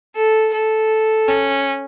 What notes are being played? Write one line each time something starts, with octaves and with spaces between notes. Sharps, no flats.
A4
A4
C#4